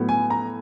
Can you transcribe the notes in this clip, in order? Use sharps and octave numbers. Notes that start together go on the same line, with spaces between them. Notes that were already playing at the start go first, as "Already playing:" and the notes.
Already playing: A2 F#3 B3
G#5
A#5